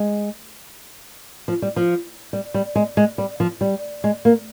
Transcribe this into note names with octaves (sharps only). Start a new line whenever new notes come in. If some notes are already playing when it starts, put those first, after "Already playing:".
Already playing: G#3
F3
G3
F3
G3
G3
G#3
G#3
G3
F3
G3
G#3
A#3